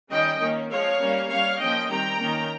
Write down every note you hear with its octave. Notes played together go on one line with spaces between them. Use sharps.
D#3 G3 C#4 D#5 G5
D#3 A#3 C#4
F3 G#3 C4 C#5 F5
G3 A#3 C#4
G3 C#4 C#5 F5
F3 A#3 C#4 D#5 G5
D#3 G3 C4 G5 A#5
D#3 A#3 C#4